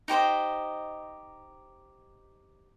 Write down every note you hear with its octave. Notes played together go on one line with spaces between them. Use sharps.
D#4 G4 C5 D#5